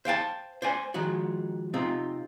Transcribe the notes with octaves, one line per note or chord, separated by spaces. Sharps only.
C5 F5 G5 A5
C5 D5 G#5
D#3 F3 G#3 F#4
C3 C4 D#4 F4